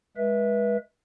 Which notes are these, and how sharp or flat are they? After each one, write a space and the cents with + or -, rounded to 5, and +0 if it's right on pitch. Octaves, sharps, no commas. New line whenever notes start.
G#3 -5 B4 -30 E5 +0